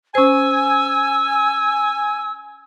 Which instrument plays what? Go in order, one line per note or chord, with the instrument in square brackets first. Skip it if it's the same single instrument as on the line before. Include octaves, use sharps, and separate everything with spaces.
[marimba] C#4 C5 [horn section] G#5 [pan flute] E6